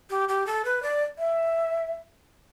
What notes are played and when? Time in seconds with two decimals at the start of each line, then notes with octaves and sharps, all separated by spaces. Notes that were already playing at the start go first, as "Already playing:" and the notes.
0.10 G4
0.29 G4
0.47 A4
0.65 B4
0.83 D5
1.18 E5